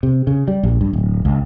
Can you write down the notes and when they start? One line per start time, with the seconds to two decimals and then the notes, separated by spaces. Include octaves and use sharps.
0.03 C3
0.27 C#3
0.48 G3
0.63 A#1
0.81 G2
0.93 D1
1.25 C#2